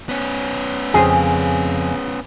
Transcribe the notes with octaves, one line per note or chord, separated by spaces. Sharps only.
B3 C#4
F2 C#3 G#4 C5